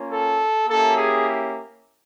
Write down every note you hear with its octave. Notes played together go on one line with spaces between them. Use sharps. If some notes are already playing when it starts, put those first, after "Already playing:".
Already playing: A#3 C#4 F4
A4
A#3 C#4 E4 G4 A4
G#4